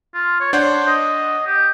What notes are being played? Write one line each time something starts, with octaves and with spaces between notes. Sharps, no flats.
F4
C#5
D4 C5 C#5 F#5
D#5
G4